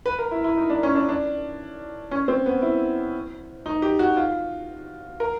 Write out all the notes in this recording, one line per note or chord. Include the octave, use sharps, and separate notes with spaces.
B4
A#4
E4
E4
D#4
D4
C#4
D4
D4
C#4
C4
B3
E4
D#4
G4
F#4
F4
A#4